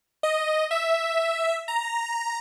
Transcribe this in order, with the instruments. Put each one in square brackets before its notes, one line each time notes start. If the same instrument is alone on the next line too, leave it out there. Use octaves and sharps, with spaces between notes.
[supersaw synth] D#5
E5
A#5